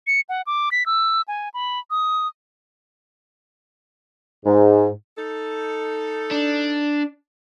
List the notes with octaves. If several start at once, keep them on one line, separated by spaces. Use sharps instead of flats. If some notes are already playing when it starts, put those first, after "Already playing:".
C#7
F#5
D6
B6
E6
G#5
B5
D#6
G#2
D#4 A4
D4